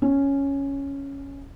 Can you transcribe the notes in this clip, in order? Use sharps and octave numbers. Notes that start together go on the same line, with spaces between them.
C#4